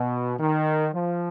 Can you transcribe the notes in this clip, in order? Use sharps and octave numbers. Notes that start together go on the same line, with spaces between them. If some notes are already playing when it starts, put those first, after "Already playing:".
Already playing: B2
D#3
F3